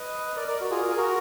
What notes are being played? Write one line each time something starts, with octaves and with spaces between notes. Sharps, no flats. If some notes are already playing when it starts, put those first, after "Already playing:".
Already playing: B4 D#5
A#4 D5
A#4 D5
F#4
F4 G#4
A#4
G#4
F#4 A#4